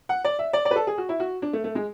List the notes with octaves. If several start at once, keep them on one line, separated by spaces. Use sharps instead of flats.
F#5
D5
E5
D5
D5
B4
A4
G#4
F#4
E4
F#4
D4
A3
A3
G#3